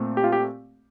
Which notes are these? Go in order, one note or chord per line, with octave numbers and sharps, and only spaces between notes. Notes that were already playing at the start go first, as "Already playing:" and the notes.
Already playing: A#2 A3 C4
G4
F4
G4